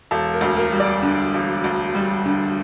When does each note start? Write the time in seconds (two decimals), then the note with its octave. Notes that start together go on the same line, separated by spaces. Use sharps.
0.11 E1 A4
0.34 A#4
0.41 D2
0.57 A#4
0.72 G3
0.80 D5
1.02 D3
1.34 E1
1.64 D2
1.95 G3
2.26 D3